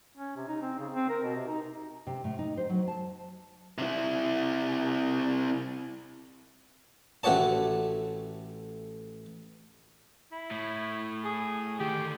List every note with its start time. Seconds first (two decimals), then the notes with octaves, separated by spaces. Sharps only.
0.17 C#4
0.37 C3
0.48 D#4
0.62 C4
0.79 C#3
0.93 C4
1.09 A#4
1.23 B2
1.35 C3
1.47 D#4
2.07 C3
2.24 A2
2.39 D#4
2.57 C5
2.69 F#3
2.88 A5
3.78 C3 E4
7.23 A1 A3 F#4 G4 C#5 A5
10.32 E4
10.52 A2
11.25 G#4
11.80 D3 D#3 G4